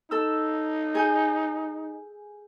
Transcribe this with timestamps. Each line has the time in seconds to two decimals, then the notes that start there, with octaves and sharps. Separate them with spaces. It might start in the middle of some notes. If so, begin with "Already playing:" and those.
0.11 D#4 A4 E6
0.95 G#4 G#5 G6